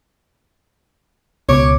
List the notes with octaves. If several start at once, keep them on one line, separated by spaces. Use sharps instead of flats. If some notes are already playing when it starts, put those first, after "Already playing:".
C#2 B2 C#5 D6